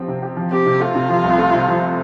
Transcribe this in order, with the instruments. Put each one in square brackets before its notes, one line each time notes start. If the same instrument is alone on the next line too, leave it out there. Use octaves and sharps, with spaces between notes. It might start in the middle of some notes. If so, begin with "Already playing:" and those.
Already playing: [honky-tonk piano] F3 C4 G4
C3
G4
F3
[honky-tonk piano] C4 [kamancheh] G4
[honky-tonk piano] C3
[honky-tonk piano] A3 [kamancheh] F4
[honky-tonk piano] C3
F3
C2
A3
C3
F3